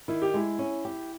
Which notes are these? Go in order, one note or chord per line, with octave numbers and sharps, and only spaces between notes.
D#3 E4
G4
G#3 E4
C#4
G4